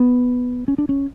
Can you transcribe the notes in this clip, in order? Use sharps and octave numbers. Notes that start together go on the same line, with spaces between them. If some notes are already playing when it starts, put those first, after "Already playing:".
Already playing: B3
C#4
D4
C#4